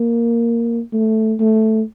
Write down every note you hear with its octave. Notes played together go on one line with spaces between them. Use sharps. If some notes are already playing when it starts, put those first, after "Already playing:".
Already playing: A#3
A3
A3